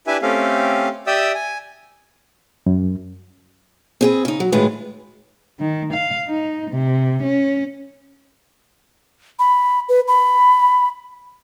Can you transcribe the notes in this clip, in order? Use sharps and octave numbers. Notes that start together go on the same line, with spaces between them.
D4 E4 G4 B4 E5 G#5
A3 C4 C#4 G4 A4 F5
G4 D5 E5 G5 D#6 E6
G#5
F#2
C4 G#4 B4
C#3 D#4
F#3
A2 D#3 G#3 F4 G#4 B4
D#3
F5
D#4
C3
C#4
B5
B4
B5